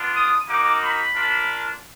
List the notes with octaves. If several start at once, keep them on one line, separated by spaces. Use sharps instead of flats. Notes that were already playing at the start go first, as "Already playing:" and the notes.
Already playing: B3 D4 F4
D#6
A#3 D#4 F#4 D6
B5
A#3 D4 F4